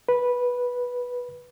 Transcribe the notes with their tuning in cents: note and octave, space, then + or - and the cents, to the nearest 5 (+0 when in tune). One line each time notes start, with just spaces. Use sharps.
B4 -10